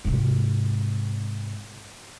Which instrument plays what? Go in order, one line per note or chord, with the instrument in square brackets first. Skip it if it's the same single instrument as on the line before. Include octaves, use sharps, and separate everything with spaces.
[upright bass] G#2 C3